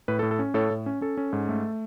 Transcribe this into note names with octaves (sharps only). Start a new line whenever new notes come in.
A2 B4
A4
A2
A4
C#4
A2 A4 C#5
A2
C#4
C#4 A4
C#4
G#2
A3